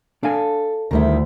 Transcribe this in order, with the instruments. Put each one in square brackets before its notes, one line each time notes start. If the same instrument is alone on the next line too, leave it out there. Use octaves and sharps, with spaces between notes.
[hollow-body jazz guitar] D4 F5 G#5 [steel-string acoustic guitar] A4
[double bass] D2 [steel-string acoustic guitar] D#3 G3 E4